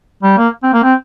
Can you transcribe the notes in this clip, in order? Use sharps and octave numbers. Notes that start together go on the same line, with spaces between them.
G3
A#3
C4
A#3
C4